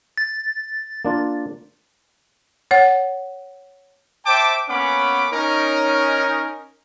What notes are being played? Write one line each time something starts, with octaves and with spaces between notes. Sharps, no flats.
A6
A#3 D4 F4
C#5 F#5
C5 E5 G5 A5 D6
A#3 B3 C#4 F#5 B5 D6
C#4 D#4 A#4